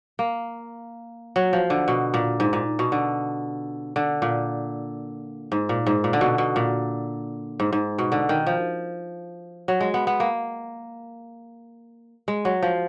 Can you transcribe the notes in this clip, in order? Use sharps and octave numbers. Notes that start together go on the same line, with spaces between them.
A#3
F#3
F3
D3
B2
A#2
G#2
A#2
B2
D3
D3
A#2
G#2
A#2
G#2
A#2
D3
B2
B2
A#2
G#2
G#2
B2
D3
D#3
F3
F#3
G#3
B3
B3
A#3
G#3
F#3
F3